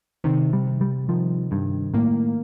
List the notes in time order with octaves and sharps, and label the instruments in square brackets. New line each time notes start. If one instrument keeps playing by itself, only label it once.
[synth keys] C3 [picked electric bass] D#3
[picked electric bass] G3
[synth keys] C3
[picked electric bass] G3
[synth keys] D#3 [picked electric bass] F3
[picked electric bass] G2 [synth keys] D#3
[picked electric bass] A2 [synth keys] A#3